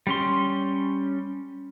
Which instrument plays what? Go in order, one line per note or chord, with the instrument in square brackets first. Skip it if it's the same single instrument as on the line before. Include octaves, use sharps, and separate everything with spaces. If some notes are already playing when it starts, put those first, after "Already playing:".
[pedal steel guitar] G3 C#4 C6